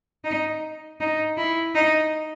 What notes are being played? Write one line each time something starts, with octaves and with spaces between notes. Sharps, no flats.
D#4
D#4
E4
D#4